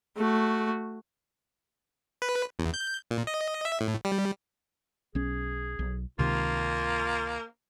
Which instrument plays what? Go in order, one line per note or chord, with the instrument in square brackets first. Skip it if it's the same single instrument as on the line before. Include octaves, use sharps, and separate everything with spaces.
[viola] A3 F#4
[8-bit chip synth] B4
E2
G6
A#2
D#5
E5
A2
G3
[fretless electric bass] B1 C#4 [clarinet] G#4
[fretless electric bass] B1
[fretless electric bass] C#2 C3 D#3 [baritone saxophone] A#3 [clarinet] F4